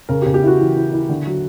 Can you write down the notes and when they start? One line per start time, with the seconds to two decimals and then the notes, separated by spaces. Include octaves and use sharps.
0.09 C#3 A#4
0.22 G4
0.26 C#3
0.34 G4
0.43 E4 F#4
0.59 E3
0.76 E4
0.92 E4
1.09 D3
1.27 F#3